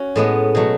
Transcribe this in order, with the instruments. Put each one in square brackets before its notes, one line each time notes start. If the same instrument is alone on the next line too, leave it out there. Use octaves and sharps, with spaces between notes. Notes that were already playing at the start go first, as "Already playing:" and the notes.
Already playing: [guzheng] C#4 F#4
A2 G#3 B3
B2 F#3 A3